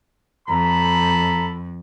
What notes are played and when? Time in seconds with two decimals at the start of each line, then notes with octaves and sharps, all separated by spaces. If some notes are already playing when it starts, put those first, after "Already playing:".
0.48 F2 A4 A#5 B5